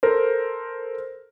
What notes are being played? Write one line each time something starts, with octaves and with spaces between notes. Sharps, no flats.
A4 A#4 C5